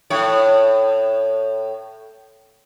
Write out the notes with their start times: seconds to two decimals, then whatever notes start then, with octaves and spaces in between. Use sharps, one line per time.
0.10 A2 C#5